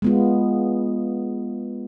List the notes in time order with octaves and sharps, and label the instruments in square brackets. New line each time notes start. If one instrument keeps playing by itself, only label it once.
[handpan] G#3 B3 F4